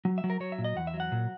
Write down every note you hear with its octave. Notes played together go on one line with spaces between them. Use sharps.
F#3
E5
F#3
A#4
F#3 C#5
E5
A#2
D#5
E2 F#5
E5
F#3
F#5
A#2